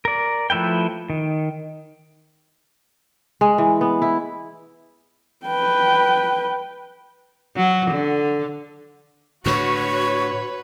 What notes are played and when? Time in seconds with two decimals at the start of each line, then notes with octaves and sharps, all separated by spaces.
0.05 A#4 D5
0.50 F3 A3 E4 B4 G5
1.10 D#3
3.41 G#3
3.58 E3
3.81 B3
4.02 E4
5.46 B4 G5
7.56 F#3
7.91 D3
9.46 A2 D3 F#4 B4 C#5 C#6